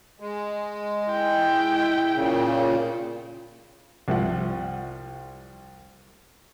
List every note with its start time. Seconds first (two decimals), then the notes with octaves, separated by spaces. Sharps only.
0.20 G#3
1.10 E4 G5
2.14 A#2 C#3
4.08 C2 F3 E5 F#5